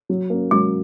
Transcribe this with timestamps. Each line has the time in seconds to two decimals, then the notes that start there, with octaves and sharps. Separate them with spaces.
0.09 F#3
0.30 A#3 C#4
0.51 F#3 G#3